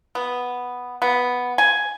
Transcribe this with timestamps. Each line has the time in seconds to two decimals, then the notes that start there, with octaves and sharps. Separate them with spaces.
0.15 B3
1.02 B3
1.58 G#5